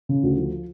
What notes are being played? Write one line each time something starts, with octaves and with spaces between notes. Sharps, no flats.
C#3
D2
F3